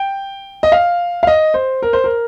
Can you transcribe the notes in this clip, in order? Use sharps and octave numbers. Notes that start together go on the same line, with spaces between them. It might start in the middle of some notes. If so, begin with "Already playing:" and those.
Already playing: G5
D#5
F5
F5
D#5
C5
A#4
C5
A#4